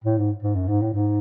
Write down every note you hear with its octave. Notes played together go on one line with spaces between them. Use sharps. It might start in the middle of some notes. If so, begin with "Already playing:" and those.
A2
G#2
G#2
F#2
G#2
A2
G#2